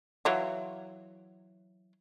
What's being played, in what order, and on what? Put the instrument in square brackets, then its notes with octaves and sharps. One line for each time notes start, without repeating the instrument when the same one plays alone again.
[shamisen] E3 F#3 F4